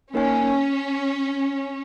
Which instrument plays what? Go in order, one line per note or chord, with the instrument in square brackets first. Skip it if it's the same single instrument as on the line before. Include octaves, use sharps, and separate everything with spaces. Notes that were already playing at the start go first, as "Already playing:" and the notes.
[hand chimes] A#3 D#4 A#4 C#5 G#5 [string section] C#4